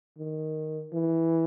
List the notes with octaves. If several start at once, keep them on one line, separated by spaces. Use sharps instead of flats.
D#3
E3